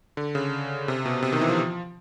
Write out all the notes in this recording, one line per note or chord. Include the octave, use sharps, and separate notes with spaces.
D3
C#3
C3
B2
C3
D#3
E3
F3